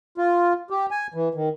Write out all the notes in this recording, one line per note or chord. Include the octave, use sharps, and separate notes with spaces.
F4
G4
G#5
E3
D#3